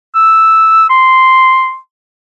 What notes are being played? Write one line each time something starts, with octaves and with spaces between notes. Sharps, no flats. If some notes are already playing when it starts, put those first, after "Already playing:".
E6
C6